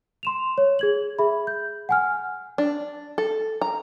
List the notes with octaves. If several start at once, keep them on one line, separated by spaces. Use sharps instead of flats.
C6 E7 F7
C#5
G#4 G#6 F#7
G#4 E5 B5
G6
F#5 G#5 F6
D4
A4
A#5